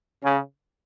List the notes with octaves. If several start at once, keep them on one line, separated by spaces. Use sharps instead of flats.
C#3